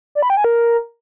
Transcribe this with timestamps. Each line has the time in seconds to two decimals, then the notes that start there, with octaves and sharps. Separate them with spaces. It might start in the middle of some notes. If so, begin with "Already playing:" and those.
0.15 D5
0.22 B5
0.30 G5
0.37 G#5
0.44 A#4